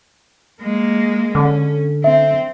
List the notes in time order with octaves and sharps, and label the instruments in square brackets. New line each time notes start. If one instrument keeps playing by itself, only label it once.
[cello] G#3 A#3
[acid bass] D3 [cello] C#4
[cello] C4 [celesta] E5